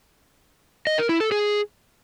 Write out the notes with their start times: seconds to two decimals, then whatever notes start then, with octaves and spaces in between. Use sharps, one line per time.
0.87 D#5
0.98 A#4
1.09 E4
1.20 A4
1.32 G#4